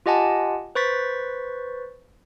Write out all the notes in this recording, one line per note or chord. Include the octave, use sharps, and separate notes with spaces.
F4 G4 D#5 F#5 G#5 A5
B4 C5 C#6 A6 B6